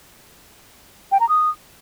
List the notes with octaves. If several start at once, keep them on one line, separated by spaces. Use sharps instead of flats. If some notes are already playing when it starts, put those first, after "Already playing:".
G5
A#5
D#6